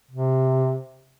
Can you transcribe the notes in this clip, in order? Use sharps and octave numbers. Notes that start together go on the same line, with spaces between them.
C3